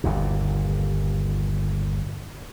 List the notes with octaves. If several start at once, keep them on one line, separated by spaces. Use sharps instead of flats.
G1 D#2 A#2